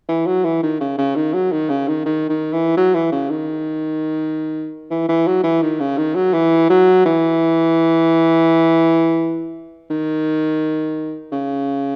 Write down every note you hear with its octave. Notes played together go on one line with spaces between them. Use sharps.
E3
F#3
E3
D#3
C#3
C#3
D#3
F#3
D#3
C#3
D#3
D#3
D#3
E3
F#3
E3
C#3
D#3
E3
E3
F#3
E3
D#3
C#3
D#3
F#3
E3
F#3
E3
D#3
C#3